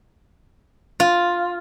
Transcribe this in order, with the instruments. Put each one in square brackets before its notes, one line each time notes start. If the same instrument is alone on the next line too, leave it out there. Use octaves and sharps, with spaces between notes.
[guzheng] F4